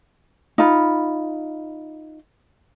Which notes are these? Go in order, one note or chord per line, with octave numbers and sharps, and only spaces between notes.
D#4 F4 B5